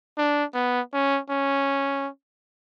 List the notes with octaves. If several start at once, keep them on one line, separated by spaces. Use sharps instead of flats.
D4
B3
C#4
C#4